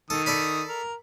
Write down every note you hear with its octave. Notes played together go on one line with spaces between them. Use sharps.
D#3 A4 D#6
A4 D5 B5
A#4